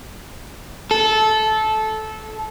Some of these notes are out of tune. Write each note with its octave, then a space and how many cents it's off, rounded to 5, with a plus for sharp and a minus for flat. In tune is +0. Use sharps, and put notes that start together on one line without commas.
A4 -15